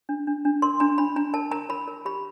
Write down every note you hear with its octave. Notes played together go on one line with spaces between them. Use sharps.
D4
D4
D4
A#4 C6
D4 A#5
D4 B5
D4 A#5
A#4 A5
A#4 A#5
A#4 B5
A#4
G4 B5